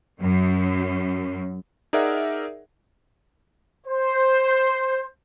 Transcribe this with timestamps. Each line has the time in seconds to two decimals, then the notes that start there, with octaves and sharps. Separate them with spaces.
0.21 F#2
1.93 D#4 G#4 A#4 D5 E5 F#5
3.86 C5